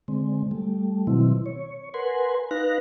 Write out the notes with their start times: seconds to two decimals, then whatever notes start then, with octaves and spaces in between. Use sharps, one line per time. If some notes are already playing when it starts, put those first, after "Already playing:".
0.08 D3 G#3 C4
0.51 G3 A3
1.07 B2 D#3 F#3 C4 E4
1.46 C#5
1.94 A#4 B4 F#5 G#5 C6
2.51 D#4 B4 F5 F#6 A#6